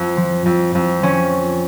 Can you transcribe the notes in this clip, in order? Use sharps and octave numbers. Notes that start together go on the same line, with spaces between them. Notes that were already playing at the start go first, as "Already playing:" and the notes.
Already playing: F2
F3
F2
F2
F3 C#4